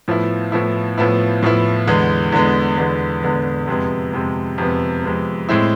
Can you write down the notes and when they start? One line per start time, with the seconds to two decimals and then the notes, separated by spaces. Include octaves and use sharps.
0.08 A2 F3 B3 E4
0.52 A2 F3 B3 E4
0.98 A2 F3 B3 E4
1.43 A2 F3 B3 E4
1.87 E2 D3 G#3 B3
2.32 E2 D3 G#3 B3
2.78 E2 D3 G#3 B3
3.23 E2 D3 G#3 B3
3.67 F2 C3 G#3 B3
4.13 F2 C3 G#3 B3
4.58 F2 C3 G#3 B3
5.03 F2 C3 G#3 B3
5.49 A2 G#3 C4 E4